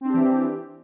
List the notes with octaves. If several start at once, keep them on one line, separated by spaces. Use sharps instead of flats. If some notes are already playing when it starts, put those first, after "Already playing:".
E3 C4 D4 G4